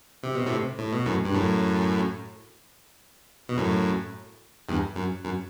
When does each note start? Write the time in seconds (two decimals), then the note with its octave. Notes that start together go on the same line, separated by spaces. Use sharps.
0.23 C3
0.35 B2
0.47 A2 C3
0.78 A2
0.92 B2
1.06 F#2 A2
1.25 G2
1.34 F#2 A2
3.49 B2
3.57 F#2 A2
4.69 E2 G2
4.96 F#2
5.25 F#2